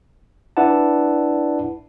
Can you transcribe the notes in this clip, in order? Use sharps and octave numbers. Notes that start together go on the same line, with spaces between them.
D4 E4 B4 D5 F#5 A5